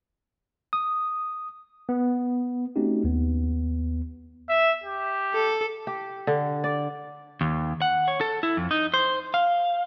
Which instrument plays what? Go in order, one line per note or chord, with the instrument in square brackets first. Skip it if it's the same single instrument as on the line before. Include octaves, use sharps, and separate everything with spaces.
[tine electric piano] D#6
B3
A3 C4 C#4 D#4 F#4 G4
D#2 B3
[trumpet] E5
G4
[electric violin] A4
[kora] G4
D3
D5
[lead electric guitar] D#2
F#5
C#5
A4
E4
F2
D#4
C5
F5